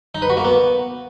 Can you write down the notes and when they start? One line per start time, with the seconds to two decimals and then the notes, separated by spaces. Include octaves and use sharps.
0.15 D#4
0.22 B4
0.30 F#4
0.37 A#3
0.45 B3